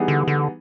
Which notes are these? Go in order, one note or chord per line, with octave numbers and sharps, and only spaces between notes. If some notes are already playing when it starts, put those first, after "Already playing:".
Already playing: E3 G3 B3 D#4 G#4
D3
D3